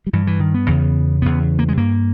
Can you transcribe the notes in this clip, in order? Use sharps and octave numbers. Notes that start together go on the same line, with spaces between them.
G3
G2 E3
E3
D#3
B3
E2 C#3
E2 C#3 B3
A#3
G#3
G2 A#3